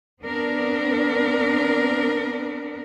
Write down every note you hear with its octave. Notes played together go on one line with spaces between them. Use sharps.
B3 C4 D4 A#4 B4